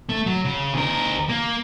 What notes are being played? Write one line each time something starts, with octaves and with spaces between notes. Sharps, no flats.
A3
F#3
C#3
D2 A#4
A#3